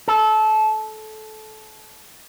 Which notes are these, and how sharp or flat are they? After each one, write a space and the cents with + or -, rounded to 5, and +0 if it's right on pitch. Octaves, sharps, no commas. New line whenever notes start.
A4 -20